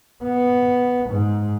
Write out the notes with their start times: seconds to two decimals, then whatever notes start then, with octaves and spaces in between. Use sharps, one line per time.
0.24 B3
1.10 G#2